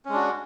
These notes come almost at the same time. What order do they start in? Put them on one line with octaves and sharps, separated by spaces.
C#4 G#3 D4 F#4